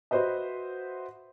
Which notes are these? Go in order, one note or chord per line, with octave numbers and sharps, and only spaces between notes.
F#4 B4 C5 D#5 E5